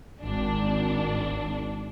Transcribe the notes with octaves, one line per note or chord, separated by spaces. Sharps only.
G#1 D4